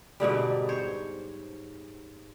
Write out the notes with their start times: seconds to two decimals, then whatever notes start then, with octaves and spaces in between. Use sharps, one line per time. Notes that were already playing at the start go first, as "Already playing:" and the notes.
0.20 G#2 B2 D3 G3
0.69 C5 C#5